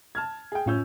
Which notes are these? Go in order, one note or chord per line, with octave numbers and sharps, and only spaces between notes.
A5 F6 G#6
G#4 G5
F#2 A2 C#4 F4 E6 G6